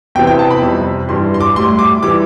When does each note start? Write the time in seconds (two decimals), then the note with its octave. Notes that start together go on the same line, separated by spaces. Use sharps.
0.15 E2 C3 E3 G5
0.27 G5
0.39 A5
0.50 B5
0.62 F2 C3 G3
1.09 G2 E3 G3 C6
1.34 C6
1.41 D6
1.56 A2 G3 C6
1.79 D6
2.03 E3 G3 D6